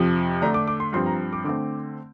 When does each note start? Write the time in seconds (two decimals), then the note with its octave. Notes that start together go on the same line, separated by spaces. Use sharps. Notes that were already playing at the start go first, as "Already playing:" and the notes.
Already playing: F2 C3 F3
0.42 D3 A3 D4 A#5
0.54 D6
0.68 D6
0.80 C6
0.93 G2 F3 C4 C6
1.06 A#5
1.33 D6
1.44 D3 A3 C4 D6